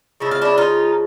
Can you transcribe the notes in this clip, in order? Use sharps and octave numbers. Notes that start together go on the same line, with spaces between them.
C#3 F3 G#3 E4
F4
D4 E4
D#4 F4